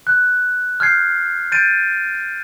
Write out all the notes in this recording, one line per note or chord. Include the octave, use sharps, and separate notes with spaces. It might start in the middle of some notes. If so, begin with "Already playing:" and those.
F#6
F6 G6 G#6 C7
G6 A6 D7 D#7